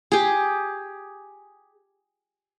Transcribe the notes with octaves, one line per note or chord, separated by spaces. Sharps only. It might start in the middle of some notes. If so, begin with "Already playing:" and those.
G4 G#4